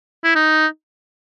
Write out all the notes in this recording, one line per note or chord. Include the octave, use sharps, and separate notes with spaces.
E4
D#4